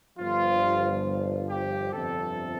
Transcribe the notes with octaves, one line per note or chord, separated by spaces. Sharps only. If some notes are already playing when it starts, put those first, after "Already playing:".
G1 G2 F3 F4
G4
G1 F2 C3 A4